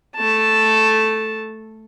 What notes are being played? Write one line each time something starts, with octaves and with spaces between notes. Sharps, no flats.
A3 A5